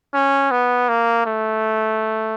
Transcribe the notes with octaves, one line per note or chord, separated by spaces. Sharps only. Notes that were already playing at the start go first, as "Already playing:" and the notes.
C#4
B3
A#3
A3